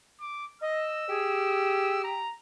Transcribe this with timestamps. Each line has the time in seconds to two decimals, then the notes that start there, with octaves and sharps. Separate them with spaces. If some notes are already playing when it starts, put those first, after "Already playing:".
0.20 D6
0.61 D#5 E6
1.09 G4 G#4
2.04 A#5